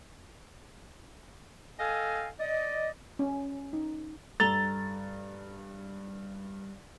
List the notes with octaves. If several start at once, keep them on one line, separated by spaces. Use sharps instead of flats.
A4 D#5 F5 G5 G#5
D5 D#5
C#4
D#4
G2 A4 A#5 A6 G7